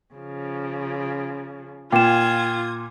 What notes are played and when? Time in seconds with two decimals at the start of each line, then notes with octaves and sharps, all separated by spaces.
0.14 C#3 F3
1.92 A#2 F4 G5 D#6 G#6 E7